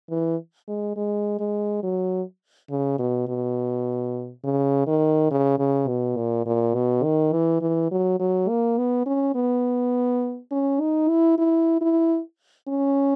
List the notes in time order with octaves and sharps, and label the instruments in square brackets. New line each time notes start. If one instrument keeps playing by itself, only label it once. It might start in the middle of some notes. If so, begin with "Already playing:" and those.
[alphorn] E3
G#3
G#3
G#3
F#3
C#3
B2
B2
C#3
D#3
C#3
C#3
B2
A#2
A#2
B2
D#3
E3
E3
F#3
F#3
A#3
B3
C#4
B3
C#4
D#4
E4
E4
E4
C#4